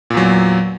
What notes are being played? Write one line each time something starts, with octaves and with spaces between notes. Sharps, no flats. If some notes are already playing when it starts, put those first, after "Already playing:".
E2 A#2 F#3